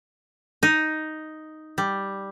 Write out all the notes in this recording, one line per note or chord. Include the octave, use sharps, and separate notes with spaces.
D#4
G3